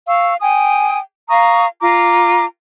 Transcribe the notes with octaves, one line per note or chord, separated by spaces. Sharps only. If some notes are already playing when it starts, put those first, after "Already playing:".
F5 C#6 E6
G5 G#5 D#6
F5 A#5 C#6 D#6
F4 A#5 D6